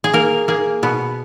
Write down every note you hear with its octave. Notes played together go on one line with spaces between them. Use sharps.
G#4
A#3 A#4
A#3 G#4
B2 B3